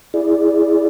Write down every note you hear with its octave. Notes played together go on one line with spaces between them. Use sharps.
E4 G#4 D5